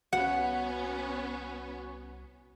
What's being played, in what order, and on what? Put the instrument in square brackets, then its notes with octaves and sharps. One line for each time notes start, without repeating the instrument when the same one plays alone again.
[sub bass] C2 [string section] B3 C#4 [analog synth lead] F#4 [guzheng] F#5